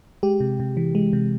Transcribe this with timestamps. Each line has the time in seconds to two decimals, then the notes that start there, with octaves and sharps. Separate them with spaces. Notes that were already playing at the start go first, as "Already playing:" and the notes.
0.23 G#3 G4
0.40 C3
0.60 C3
0.77 E3
0.95 G#3
1.13 C3